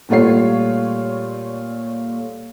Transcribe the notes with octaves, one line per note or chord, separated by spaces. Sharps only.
A#2 G3 A3 F4 C#5 C7